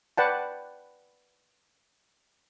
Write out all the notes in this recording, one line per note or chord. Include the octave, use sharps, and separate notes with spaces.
B4 D5 F#5 G5 A5